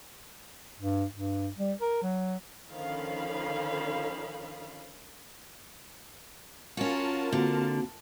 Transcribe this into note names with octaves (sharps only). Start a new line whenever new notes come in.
G2
G2
G3
A#4
F#3
D3 D#3 F3 C#4 F5 B5
C#4 F4 F#4 A#4 A5
D3 A#3 C4 F#4